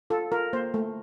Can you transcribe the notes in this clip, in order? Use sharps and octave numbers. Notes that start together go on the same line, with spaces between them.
F4 A4
F4 A#4
A#3 C5
A3